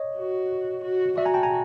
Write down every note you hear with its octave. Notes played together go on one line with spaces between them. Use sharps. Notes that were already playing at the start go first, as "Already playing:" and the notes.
Already playing: C#5 D#5
F#4
F#4
F#4 D5 E5
G#5 A#5
G5 A5
G#5 A#5